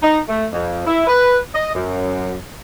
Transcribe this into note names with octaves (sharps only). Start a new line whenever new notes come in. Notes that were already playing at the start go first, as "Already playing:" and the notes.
D#4
A3
F2
E4
B4
D#5
F#2